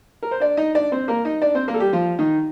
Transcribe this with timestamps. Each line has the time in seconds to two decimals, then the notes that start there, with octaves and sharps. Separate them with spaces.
0.23 A#4
0.31 C5
0.40 D4 D5
0.57 D#4 D#5
0.75 D4 D5
0.92 C4 C5
1.08 A#3 A#4
1.25 D#4 D#5
1.42 D4 D5
1.55 C4 C5
1.68 A#3 A#4
1.74 A4
1.80 G3 G4
1.93 F3 F4
2.19 D#3 D#4